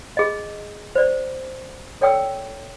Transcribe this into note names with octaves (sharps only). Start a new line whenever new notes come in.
G#4 D#5
C5 D5
A4 C#5 D5 G5 D#6 E6